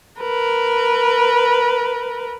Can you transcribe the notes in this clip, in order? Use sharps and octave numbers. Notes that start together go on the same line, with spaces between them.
A#4 B4